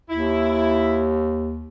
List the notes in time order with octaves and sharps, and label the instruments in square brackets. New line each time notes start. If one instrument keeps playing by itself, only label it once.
[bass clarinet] D#2 [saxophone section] E4